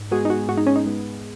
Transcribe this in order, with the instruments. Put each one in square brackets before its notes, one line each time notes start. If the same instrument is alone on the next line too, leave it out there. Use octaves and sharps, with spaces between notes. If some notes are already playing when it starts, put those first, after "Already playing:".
Already playing: [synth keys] G#2
[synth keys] G#3 B3 G#4 [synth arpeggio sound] F#4
[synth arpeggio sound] D#4
F#4
[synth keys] G#2 [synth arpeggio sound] F#4
[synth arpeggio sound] D#4
C#4
D#4
[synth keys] G#3 B3 G#4